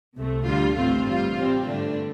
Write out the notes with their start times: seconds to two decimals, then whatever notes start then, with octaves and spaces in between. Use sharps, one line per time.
0.16 C2 C3 A3
0.46 D2 D3 G3 F4
0.75 A1 A2 A3 C4 F4
1.05 A1 G2 G3 F4
1.36 C3 G3 C4
1.66 G2 D3 A3 D4